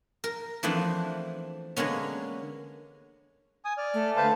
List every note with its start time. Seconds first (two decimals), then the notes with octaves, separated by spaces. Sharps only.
0.24 A#4
0.63 E3 F3 A3 B3 C4 D4
1.77 D3 G#3 A#3 B3 C#4
3.65 G#5 D#6
3.78 D5 F6
3.94 A3
4.16 D3 B4 C5 F5 A5